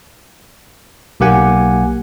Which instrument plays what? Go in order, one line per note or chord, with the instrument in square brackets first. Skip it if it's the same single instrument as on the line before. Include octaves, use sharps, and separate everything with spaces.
[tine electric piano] B1 A#3 G4 F#5 G#5